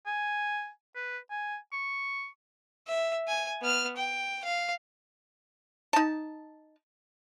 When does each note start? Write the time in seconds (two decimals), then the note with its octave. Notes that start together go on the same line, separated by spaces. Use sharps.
0.06 G#5
0.95 B4
1.30 G#5
1.72 C#6
2.88 E5
3.28 G#5
3.62 B3 F6
3.96 G5
4.44 F5
5.93 D#4 A5